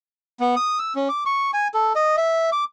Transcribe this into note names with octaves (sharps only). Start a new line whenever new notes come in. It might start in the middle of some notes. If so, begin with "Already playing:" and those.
B3
D#6
E6
C#4
D6
C#6
G#5
A4
D#5
E5
D6